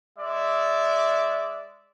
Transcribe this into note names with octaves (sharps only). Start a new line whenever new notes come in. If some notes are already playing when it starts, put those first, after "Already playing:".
G#3 D5 E5